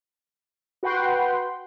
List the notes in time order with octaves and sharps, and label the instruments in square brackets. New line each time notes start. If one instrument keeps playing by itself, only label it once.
[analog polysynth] F#4 B4 F#5 G5 C6